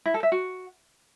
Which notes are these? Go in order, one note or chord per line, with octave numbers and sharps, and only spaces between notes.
E4
A4
E5
F#4